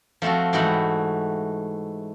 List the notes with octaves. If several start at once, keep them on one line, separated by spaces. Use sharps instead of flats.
F3 A3 C4 F4 F#4
G#2 E3 A3 F#4 G5 B5